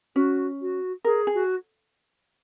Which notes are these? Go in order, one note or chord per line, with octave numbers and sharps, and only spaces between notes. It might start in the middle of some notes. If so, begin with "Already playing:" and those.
C#4 F#4
F#4
G#4 A#4
G#4
F#4